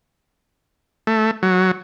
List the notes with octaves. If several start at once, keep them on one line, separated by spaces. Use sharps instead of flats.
A3
F#3